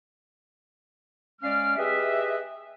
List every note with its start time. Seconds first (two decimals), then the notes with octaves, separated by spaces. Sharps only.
1.42 G#3 C#4 D5 F5 F6
1.77 G4 G#4 B4 D#5 E5